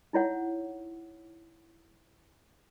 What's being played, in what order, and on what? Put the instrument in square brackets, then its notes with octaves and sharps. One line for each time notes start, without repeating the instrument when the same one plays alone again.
[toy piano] D#4 E4 C#5 F#5